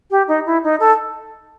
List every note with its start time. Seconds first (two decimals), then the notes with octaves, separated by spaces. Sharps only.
0.11 G4
0.28 D#4
0.46 E4
0.64 D#4
0.80 A4